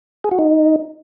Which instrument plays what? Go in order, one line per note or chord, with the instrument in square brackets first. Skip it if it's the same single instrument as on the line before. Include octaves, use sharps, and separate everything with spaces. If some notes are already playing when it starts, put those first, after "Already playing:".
[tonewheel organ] G#4
F#4
D#4